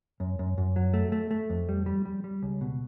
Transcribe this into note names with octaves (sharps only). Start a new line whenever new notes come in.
F#2
F#2
F#2
F#3
A3
A3
A3
F2
G3
G3
G3
G3
C#2
B2